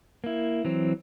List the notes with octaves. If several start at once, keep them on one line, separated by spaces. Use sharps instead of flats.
A#3 E4
E3 F#3 C4